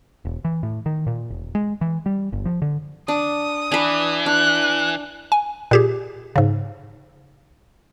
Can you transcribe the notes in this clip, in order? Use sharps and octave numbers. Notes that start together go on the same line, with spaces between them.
E1
E3
A2
D#3
A#2
E1
G#3
E3
G3
G1
F3
D3
D4 D#6
E3 D4 B4
D4 F#6
G#5
A#2 G4 G#4
G#2 C#3